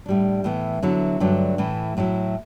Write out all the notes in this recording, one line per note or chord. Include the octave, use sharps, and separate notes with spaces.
A2 G3 D4
A2 E3 B3
D3 F#3 B3 E4
G2 D3 F#3 A3 D4
A2 E3 A3
A2 F#3 A3 E4